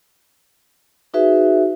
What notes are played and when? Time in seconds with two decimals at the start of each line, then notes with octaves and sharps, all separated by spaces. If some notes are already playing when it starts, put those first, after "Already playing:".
1.14 D#4 F#4 G#4 B4 E5